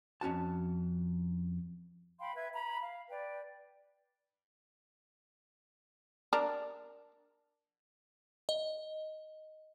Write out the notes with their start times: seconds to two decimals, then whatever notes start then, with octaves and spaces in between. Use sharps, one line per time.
0.21 F2 C#4 F#4 A5
2.20 F5 G5 B5 C6
2.35 B4 E5 G#6
2.53 A#5 B5
2.81 F5
3.09 B4 D5 G5
6.33 D4 A#4
8.49 D#5